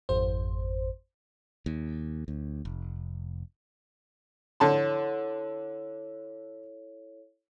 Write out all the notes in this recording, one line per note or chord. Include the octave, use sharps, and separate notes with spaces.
G#1 F2 C5
D#2
D2
F1
D3 E4 A4 C#5 A5 C6